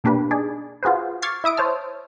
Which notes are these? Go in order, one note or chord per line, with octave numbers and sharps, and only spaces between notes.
B2 A#3 D4 G4 B4
D4 D#4 G#4 D5
F4 F#4 G#4 B4 C5
C#6 D6 F6 G#6 A6 C7
E4 E5 D#6 D7
C5 C#5 A5 F6